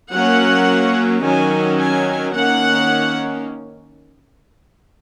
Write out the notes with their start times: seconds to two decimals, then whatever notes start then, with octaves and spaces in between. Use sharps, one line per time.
0.13 F#3 A#3 C#4 F#5
1.24 D#3 F#3 C#4 G#5
1.79 G#5
2.34 D#3 A#3 C#4 F#5